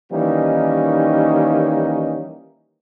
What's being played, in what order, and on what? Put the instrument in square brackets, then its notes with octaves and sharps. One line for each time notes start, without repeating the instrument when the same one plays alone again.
[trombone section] D#3 E3 G3 A#3 C#4 D#4